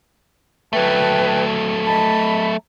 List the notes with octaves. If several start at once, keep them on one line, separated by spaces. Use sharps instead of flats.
F#3 A3 B4 G5 A5
D#5 A5 B5